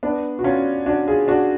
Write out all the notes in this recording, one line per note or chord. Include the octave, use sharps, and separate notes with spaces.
B3 D4
F#4
C#4 F4
D4 F#4
F4 G#4
D4 F#4